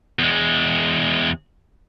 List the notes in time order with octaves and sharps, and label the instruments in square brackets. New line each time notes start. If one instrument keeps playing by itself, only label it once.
[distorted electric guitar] E2 G#3